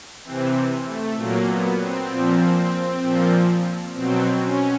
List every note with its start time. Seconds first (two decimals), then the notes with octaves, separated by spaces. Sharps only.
0.25 C3 E3 C4
0.87 A3
1.18 A#2 F#3 A#3
1.49 B3
1.79 C4
2.10 A#2 F3
3.02 A#2 F3
3.95 B2 F#3 C4
4.42 C#4